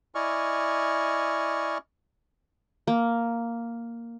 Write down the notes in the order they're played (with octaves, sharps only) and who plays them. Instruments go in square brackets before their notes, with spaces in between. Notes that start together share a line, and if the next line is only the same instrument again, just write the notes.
[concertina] E4 D5 D#5 G#5 C#6 F6
[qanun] A#3